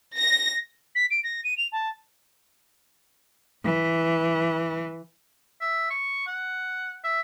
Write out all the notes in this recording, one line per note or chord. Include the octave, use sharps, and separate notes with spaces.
A#6
B6
D7
A#6
D#7
F7
A5
E3
E5
C#6
F#5
E5